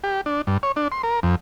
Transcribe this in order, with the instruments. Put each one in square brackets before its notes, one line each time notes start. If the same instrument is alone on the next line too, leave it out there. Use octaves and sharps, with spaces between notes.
[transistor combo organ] G4
D4
G2
C#5
D4
C6
A#4
F2